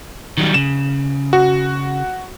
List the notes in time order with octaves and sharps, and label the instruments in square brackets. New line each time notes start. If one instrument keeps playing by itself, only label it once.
[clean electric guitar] D#3 F#3 G3
[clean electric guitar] C#3 [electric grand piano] E7
[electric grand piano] F#4